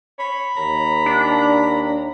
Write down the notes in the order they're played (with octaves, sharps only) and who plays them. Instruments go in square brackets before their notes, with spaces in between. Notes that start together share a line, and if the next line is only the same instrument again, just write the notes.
[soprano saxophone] C#5 [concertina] B5
[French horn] D#2 [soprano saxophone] A#5
[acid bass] D4